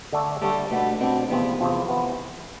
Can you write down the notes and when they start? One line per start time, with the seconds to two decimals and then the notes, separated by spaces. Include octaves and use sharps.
0.13 D3 A3 D4 A4
0.42 D3 G3 A3 D4 A4
0.71 B2 A3 B3 D4
1.00 B2 B3 C4 D4
1.29 E2 C3 F3 B3 C4
1.59 E2 C3 F3 C4
1.88 C3 E3 B3